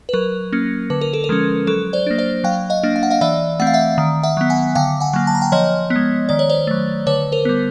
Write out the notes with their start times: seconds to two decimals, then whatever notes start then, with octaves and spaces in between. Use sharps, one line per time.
0.09 B4
0.13 F#3 A#4
0.52 A#3 C#4
0.90 D3 B4
1.01 A#4
1.13 A4
1.24 A#4
1.29 F3 G#3 C#4
1.67 F#3 A4
1.93 C5 D5
2.06 A#3 D4
2.18 C5 D5
2.44 F#3 F5 G5
2.70 D#5 F5
2.83 A#3 D4
2.96 F5
3.03 F#5
3.10 D#5 F5
3.21 E3 D5 E5
3.60 A3 C4 F#5
3.67 F5
3.74 E5 F#5
3.98 D#3
4.23 E5 F#5
4.37 F#3 B3
4.50 F#5 G#5
4.75 D3 F5 G5
5.00 F#5 G#5
5.13 F#3 A#3
5.27 A5
5.35 A#5
5.41 G5 A5
5.52 F3 C#5 D#5
5.90 B3
5.96 G#3
6.29 D#3 D5
6.39 C#5
6.49 C5 D5
6.67 F#3 A3
7.07 D3 B4 C#5
7.32 A#4 C5
7.45 G3 B3